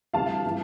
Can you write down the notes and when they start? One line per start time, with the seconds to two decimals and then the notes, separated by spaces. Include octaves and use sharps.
0.14 D2 C3 E3 G3 F5 A5
0.44 E3 G3